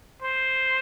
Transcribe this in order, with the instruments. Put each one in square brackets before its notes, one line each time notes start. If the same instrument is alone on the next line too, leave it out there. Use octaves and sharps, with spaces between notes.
[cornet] C5